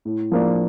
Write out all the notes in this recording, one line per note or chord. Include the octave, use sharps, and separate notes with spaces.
A2
F3 A#3 D4